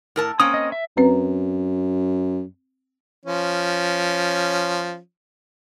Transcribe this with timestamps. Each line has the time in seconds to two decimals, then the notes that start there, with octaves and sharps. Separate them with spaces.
0.16 A2 A#4 A5
0.40 A#3 C4 C#4 D#6
0.54 D#5
0.72 E5
0.97 F#2 C4 B4 A#5
3.25 F3 C#4